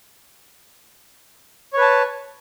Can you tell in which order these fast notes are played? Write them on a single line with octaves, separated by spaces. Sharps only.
C#5 B4 A5